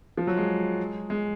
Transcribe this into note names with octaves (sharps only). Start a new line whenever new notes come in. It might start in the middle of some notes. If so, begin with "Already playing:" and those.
F3
F#3
G#3
G#3